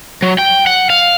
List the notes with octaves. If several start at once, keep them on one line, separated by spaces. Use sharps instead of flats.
F#3
G5
F#5
F5